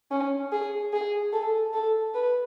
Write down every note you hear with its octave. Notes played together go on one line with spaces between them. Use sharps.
C#4
G#4
G#4
A4
A4
B4